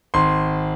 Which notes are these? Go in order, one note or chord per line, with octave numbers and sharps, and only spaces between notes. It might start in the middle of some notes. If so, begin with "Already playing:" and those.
G#1 C6